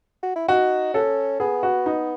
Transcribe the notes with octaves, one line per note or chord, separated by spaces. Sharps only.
F#4
E4
D#4 F#4
C#4 A4
B3 G#4
F#4
D#4